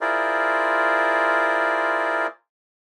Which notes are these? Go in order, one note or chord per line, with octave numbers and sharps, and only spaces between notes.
E4 F4 G#4 A#4 C5 D5